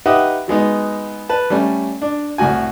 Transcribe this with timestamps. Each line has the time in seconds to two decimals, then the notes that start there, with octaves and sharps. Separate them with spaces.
0.06 D#4 G4 B4 E5 F#5 D#6
0.48 F#3 G#3 B3 D#4
1.29 B4 A5
1.50 G3 A3 C#4
2.02 D4
2.38 C2 A2 F#4 G#5